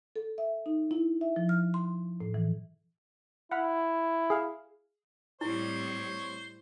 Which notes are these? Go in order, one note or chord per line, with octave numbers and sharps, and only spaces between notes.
A4
E5
D#4
E4
E5
F3
F6
C6
A2
E3
E4 F#5 B5 F6
G#4 F5
A2 G3 C4 E4 C5 C#5